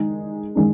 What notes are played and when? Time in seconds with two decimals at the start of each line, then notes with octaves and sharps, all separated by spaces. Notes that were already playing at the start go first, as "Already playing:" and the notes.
Already playing: D#3 G#3 D#4
0.56 D#3 G#3 D#4